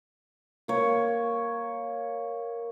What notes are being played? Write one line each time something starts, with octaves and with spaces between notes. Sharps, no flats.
A#3 C#5